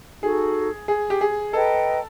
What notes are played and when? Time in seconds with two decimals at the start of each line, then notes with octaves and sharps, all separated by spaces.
0.22 D#4 F#4 G#4 A4
0.88 G#4
1.10 G4
1.21 G#4
1.53 A4 B4 D#5 G5 A#5